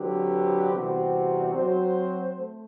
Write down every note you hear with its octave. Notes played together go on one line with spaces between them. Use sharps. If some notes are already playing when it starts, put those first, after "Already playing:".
Already playing: D3 F#3 C4 G4 B4
E2 C3 G3 C4 F#4
F#3 C4 F#4 C5
A3